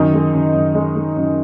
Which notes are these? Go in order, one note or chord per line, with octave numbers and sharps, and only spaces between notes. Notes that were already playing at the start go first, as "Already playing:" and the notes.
Already playing: F#2 D#3 D#4
G#3
F#2
F#2
G#3
G#3
F#2